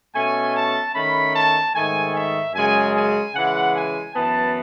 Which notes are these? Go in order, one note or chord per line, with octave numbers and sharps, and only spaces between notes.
B2 A3 C#4 G#5
A5
D#3 A3 C#4 B5
A5
G#2 D#3 A3 G#5
E5
F#2 C#3 G#3 G#5
G#5
C#3 E3 G#3 F#5
G#5
F#2 E3 B3 A5